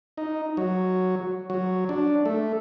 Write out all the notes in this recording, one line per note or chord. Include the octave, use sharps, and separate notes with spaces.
D#4
F#3
F#3
D4
A3